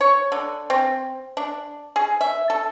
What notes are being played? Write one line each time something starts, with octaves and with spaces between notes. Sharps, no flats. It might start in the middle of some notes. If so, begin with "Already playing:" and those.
C#5
D3
C4
D4
G#4
E5
A4